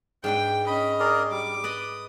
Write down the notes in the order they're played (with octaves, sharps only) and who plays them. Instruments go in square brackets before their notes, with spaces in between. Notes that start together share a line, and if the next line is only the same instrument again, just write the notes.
[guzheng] G#2 D4 B4 [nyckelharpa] G5
[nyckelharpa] C#4 D#5 [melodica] B5
[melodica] G#4 A#4 D5
[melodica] G3 [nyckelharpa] D6
[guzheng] B4 D5 D#5 [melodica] D#6